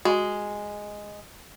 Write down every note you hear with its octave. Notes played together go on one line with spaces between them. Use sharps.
G#3 F#4